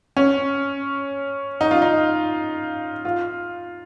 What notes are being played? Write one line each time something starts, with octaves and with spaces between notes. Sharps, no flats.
C#4
D#4
F4
D#4
F4